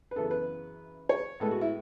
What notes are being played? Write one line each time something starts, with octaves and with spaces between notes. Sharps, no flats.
B4
F#2 C#3 E3 B3 A4
B4
C#5
A2 G#3 B3 A4
F#4
E4